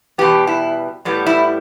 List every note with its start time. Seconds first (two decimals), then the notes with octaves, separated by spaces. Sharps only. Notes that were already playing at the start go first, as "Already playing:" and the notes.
0.18 E2 B2 G3 B3 G4
0.47 E4
1.05 A2 G3 B3
1.26 E4